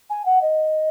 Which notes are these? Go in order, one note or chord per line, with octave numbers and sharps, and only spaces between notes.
G#5
F#5
D#5